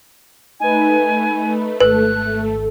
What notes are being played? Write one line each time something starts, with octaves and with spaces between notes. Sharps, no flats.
A3 D#4 B4 G#5
G#1 A4 B4 F#6